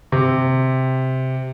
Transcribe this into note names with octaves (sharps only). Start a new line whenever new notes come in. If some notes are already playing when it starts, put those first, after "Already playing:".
C3